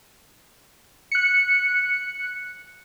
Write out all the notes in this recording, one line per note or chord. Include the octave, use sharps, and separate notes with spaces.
F#6 C#7